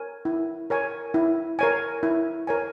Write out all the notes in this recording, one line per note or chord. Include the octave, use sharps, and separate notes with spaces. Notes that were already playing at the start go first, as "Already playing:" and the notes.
Already playing: A#4 C#5 G#5
E4
A#4 C#5 G#5
E4
A#4 C#5 G#5
E4
A#4 C#5 G#5